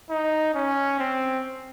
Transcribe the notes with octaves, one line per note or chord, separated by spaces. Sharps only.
D#4
C#4
C4